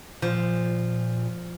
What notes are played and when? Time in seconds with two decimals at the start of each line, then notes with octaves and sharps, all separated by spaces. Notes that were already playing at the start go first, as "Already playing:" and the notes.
0.22 A#2 F3